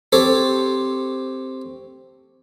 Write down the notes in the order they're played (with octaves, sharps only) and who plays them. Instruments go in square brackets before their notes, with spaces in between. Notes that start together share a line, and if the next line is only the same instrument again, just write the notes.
[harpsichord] C4 G4 A4 C5 C#5